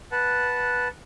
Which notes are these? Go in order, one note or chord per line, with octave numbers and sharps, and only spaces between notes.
B4 F#5 A5